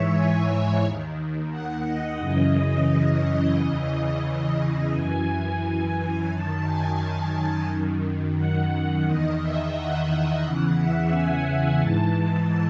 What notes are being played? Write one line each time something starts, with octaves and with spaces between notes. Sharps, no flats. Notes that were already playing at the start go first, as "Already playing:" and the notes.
Already playing: G#2 E3 C#5 E5
G#5
D#2 D#3
F#5
D#5
F#2 C#3 E3 D#5
E2 C#3 E3 D#5
F#2 E3 G#5
F#2 D#3 A5
G#5
G#5
G#5
F#2 D#3
F#5
E2 D#3 D#5
E5
F#5
E2 C#3 E3 F#5
E5
G#5
G#2 E3 A5